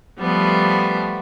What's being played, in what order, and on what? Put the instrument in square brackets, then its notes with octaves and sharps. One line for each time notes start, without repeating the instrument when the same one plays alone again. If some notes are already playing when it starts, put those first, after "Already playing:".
[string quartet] F3 G3 A3 B3